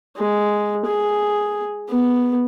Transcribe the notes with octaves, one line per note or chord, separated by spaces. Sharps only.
G#3
G#4
B3